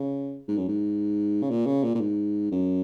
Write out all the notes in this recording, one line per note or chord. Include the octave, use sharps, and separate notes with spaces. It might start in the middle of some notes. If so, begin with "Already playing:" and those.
Already playing: C#3
G#2
F#2
G#2
C#3
A#2
C#3
A#2
A#2
G#2
F#2